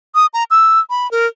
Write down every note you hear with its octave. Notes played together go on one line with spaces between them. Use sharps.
D#6
A#5
E6
B5
A#4